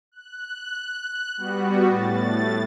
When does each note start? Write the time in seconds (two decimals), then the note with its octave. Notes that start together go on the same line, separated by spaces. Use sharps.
0.12 F#6
1.37 G3 B3 F#4
1.88 A2 A6